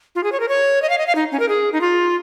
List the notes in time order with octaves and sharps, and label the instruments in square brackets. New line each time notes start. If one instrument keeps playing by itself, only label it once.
[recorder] F4
G#4
C#5
A#4
C#5
D#5
F5
D#5
F5
D#4
C#4
A#4
G#4
D#4
F4